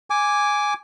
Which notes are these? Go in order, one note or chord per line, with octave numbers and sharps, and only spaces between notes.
G#5 D6